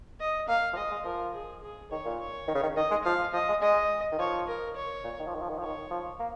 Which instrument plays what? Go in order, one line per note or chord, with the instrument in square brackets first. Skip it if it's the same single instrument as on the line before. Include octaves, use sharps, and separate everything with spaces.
[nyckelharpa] D#5
[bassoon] A#3 [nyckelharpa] F5
[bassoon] F3
[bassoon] G#3 [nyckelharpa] D#5
[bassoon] G#3
[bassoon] F3 [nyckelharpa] A#4
[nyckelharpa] G#4
G#4
[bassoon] D#3 [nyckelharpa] C#5
[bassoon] A#2
[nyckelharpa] C#5
[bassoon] D#3
C#3
D#3
[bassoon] D#3 [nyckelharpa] D#5
[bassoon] G#3
[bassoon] F3 [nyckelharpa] F5
[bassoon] F3 [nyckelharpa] D#5
[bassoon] G#3
[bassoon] G#3 [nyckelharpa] D#5
[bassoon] D#3
[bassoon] F3 [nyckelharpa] C#5
[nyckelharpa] A#4
C#5
[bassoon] A#2
D#3
F3
D#3
F3
D#3
F3
[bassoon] D#3 [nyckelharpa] C#5
[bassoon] F3
A#3